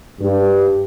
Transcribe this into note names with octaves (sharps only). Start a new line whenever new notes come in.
G2